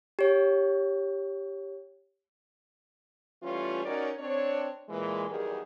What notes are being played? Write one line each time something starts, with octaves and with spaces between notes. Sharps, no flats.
G4 C#5
E3 G3 A3 C#4 F4
C#4 D#4 F#4 A#4 C#5 D5
C4 D4 C#5
A#2 E3 G#3
E2 D#3 F#3 G3 G#4 A#4